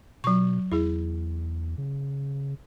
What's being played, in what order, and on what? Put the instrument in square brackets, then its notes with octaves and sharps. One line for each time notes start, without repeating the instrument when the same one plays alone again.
[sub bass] B2 [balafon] F#3 C#6
[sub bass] E2 [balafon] E4 G#4
[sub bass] C#3